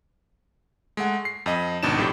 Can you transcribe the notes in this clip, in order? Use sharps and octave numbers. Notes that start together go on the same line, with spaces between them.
G#3 A3 F#5
C7
F2 D#5
G#1 B2 D4 D#4 E7
F2 A2 G4